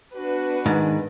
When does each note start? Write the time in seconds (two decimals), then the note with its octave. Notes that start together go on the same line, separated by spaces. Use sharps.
0.15 B3 D4 F#4 B4
0.66 G#2 D#3